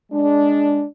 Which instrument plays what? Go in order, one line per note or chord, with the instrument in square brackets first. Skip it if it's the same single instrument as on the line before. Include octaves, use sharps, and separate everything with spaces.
[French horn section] G#3 D4